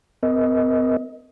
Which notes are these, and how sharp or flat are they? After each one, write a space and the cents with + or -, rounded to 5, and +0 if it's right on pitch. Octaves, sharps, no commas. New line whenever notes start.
C4 -45 A#4 +0 D#5 +20